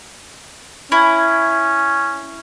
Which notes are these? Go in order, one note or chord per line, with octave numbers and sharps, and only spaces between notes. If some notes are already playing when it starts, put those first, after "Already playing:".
C#4 E4